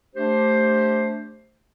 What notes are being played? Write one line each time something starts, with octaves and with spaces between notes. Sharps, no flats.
A3 D4 G4 C5